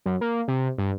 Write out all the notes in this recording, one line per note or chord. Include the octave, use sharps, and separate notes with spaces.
F#2
A#3
C3
G2